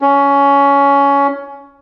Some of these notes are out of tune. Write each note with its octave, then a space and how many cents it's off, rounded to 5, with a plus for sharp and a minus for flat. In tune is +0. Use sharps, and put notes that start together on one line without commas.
C#4 +15